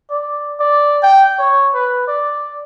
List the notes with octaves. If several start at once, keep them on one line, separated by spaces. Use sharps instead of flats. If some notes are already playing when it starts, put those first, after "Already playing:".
D5
D5
G5
C#5
B4
D5